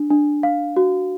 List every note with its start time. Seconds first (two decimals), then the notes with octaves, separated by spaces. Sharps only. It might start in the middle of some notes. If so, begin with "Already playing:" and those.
Already playing: D4
0.11 D4
0.43 F5
0.76 F#4